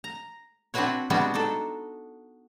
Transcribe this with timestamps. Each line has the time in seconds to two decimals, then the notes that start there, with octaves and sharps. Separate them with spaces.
0.04 A#5
0.74 C4 D4 E4 F#4 B4 C#5
1.10 G3 G#3 B3 D4 E4 F#4
1.34 D4 D#4 A4